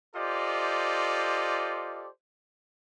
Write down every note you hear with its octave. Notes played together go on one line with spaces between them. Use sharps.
F4 G4 A4 C5 D5 D#5